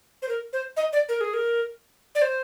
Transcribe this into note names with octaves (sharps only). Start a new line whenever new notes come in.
C5
A#4
C5
D#5
D5
A#4
G#4
A#4
D5
C5